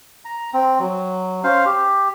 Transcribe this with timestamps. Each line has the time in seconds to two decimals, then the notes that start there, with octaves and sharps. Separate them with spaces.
0.25 A#5
0.53 C4
0.79 F#3
1.44 C#4 C5 F5
1.66 G4